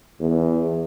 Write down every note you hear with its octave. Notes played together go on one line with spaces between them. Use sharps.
E2